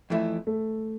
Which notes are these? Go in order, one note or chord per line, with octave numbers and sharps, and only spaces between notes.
F2 E3 A3 E4
A3